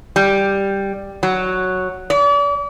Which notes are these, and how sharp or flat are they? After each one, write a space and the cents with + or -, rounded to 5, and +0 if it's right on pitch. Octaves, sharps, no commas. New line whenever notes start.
G3 +5
F#3 +0
D5 -40